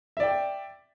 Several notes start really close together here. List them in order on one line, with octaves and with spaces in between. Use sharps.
E5 D5 G5